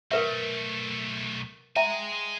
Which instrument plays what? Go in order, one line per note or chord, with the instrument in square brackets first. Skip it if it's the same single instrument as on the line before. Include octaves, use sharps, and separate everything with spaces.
[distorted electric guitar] B1 A3 [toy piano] A#4 B4 E5
[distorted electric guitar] G#3 G#5 [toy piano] E5 G5 A#5